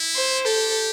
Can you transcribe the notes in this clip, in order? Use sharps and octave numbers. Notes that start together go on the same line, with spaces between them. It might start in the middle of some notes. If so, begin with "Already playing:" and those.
Already playing: E4
C5
G4 A4